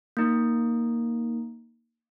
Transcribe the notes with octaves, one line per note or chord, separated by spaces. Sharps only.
A#3 D#4